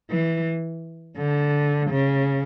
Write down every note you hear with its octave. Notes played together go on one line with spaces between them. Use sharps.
E3
D3
C#3